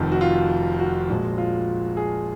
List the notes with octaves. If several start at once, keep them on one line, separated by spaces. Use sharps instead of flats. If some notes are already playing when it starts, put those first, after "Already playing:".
Already playing: F1 F2 D#3
F#4
F4
F#4
A#1 A#2 F3 G#3
F4
G#4